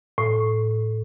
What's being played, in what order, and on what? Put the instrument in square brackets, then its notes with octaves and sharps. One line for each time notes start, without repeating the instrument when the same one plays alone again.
[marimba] A2